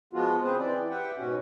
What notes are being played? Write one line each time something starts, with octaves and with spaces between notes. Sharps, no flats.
F3 G#3 B3 F4 F#4
C#3 C4 G#4 B4 C5
E3 C4 D5
G4 B4 E5 F#5 G5
G#2 B2 C#4 F#4